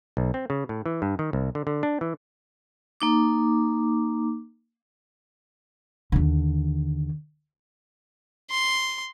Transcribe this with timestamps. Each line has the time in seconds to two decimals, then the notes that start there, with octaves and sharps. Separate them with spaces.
0.17 B1
0.34 C4
0.50 C#3
0.69 A2
0.86 E3
1.02 G2
1.19 D#3
1.33 C2
1.55 D3
1.67 D3
1.83 D4
2.01 E3
3.00 A#3 D#4 D6
6.12 D#2 D3
8.51 C6